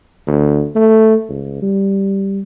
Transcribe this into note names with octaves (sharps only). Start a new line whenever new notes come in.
D2
A3
C#2
G3